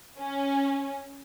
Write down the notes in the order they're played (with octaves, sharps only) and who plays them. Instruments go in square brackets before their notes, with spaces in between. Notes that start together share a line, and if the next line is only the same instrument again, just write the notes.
[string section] C#4